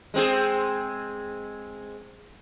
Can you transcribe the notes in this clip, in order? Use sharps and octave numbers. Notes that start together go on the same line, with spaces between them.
G#3 C4 G#4